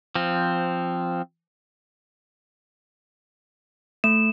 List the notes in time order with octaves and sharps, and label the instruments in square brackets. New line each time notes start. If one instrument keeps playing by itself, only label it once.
[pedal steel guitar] F3 C4
[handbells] A3 [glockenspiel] E7